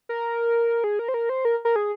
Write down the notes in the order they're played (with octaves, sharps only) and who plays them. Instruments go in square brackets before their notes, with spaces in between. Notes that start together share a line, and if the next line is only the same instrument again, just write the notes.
[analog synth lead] A#4
G#4
A#4
C5
A#4
C5
A#4
A#4
G#4